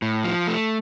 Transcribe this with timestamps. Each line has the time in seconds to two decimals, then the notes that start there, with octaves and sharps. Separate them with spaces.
0.02 A2
0.24 F3
0.47 A3